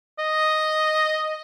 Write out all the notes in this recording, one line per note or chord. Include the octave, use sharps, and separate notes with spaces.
D#5